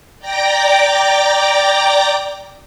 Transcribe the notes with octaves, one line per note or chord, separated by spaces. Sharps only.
D5 G5 A#5 D6 A#6